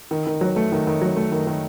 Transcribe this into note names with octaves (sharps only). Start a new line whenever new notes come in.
D#3
D#3
F#3
A3
D#3
D#3
F#3
A3
D#3
D#3